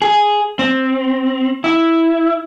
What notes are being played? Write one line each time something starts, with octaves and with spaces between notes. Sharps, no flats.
G#4
C4
E4